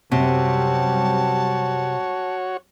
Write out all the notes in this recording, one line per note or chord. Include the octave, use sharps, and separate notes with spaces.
F#2 C3 G3 C4 F#4 C#5 A5